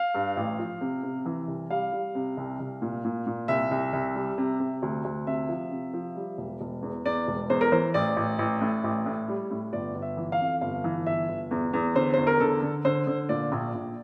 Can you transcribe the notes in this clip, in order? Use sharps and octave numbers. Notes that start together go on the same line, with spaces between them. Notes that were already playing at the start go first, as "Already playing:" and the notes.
Already playing: F5
G2
A1
F3
C3
C3
E3
C2
G3 F5
G3
C3
C2
C2
A#2
A#2
A#2
C2 E5
C2
C2
G3
C3
C3
D2
D2
C3 E5
F3
C3
F3
G3
E1
E1
E2
E2 D5
E1
E2 C5
A#4
E3 C5
A1 D5
A1
A1
A2
A1
A2
G3
A2
G1 D5
G1
E5
E3
F5
F2
G1 F5
E3
G1 E5
G1
E2
E2
D3 C5
E2 C5
A#4
D3 A4
D3
D3 C5
D3
A#2 D5
A#1
A#1